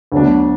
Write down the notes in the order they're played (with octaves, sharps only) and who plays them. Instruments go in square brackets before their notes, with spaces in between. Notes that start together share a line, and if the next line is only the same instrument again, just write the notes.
[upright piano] D2 D3 F#3 B3 D4